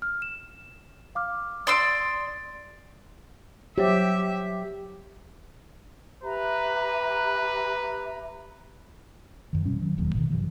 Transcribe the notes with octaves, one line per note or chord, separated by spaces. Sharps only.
F6
E7
F5 D6 F6
D5 C6 D#6 E6 C7 D7
F#3 G4 C5 C#5 E5
G4 B4 E5 A#5
F#2 D#3
B2 G3 C#4
D#3 F#3
E1 D#2 F#3
A1 B2 D#3
G2 C3 E3 F#3